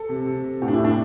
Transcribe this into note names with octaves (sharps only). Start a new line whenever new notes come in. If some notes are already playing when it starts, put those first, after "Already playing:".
Already playing: A4
C3
C3
C3
A2 G4
D4
A2 E4
D4